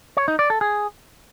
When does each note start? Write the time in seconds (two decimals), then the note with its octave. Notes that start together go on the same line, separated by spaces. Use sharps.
0.17 C#5
0.28 D#4
0.39 D5
0.50 A4
0.61 G#4